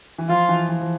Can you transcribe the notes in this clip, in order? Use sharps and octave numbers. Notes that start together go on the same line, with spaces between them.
E3
F3 F4
E3
E3
F3